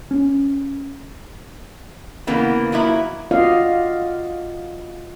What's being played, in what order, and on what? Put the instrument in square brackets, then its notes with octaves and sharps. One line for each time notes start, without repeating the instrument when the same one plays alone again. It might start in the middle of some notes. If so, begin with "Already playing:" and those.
[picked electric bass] C#4
[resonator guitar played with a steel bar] C#3 E3 A#3 B3
F3 F#3 A#3 E4
[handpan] F4 F#4 D5 D#5 F5